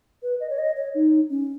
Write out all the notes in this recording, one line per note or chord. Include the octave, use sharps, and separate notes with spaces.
B4
D#5
C#5
D#5
C#5
D#4
C#4